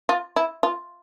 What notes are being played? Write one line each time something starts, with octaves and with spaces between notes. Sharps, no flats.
F4
E4
F4